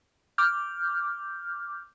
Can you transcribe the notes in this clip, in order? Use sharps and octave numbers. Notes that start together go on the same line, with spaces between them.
D6 F6 G6